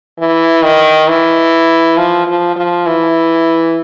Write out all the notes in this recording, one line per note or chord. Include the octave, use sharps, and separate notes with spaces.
E3
D#3
E3
F3
F3
F3
E3